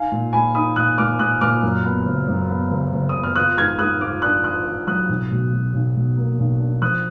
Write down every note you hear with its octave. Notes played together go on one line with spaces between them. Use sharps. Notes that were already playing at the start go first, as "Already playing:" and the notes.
Already playing: D#4 F5 G#5
A#2
A#2 G#5 B5
D#4 B5 D#6
A#2 D#6 F#6
A#2 D6 F6
A#2 D#6 F#6
A#2 D6 F6
F#2
B3
F#1
F#2
B3
F#1
F#1
B3 D#6
F6
F4 D#6 F#6
G#2 F6 G#6
G#2 D#6 F#6
F4 D6 F6
D4 D#6 F#6
F4 D#6 F#6
F4
F#3 D#6 F#6
B1
B2
B2
B1
B2
A#3
B1
D4
F3 D#6 F#6